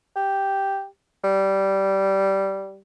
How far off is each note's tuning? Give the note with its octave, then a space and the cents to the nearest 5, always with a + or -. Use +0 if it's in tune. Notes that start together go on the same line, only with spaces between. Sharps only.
G4 +0
G3 -10